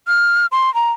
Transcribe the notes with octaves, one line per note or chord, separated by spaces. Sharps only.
F6
C6
A#5